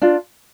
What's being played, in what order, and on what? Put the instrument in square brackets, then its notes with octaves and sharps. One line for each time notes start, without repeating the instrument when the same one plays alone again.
[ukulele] D4 F4